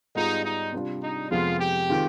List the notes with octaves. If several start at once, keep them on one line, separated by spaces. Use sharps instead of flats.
G#2 G3 B3 D#4 F4 G#4
D#4
C3 G3 D4 F4
D#4
F2 C3 F3 G#3 B3 F4
G4
D#3 G#3 C4 F4